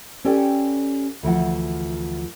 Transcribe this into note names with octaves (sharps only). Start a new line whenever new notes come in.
C#4 G4 A4 B4 D5 G5
D2 E3 F3 F#5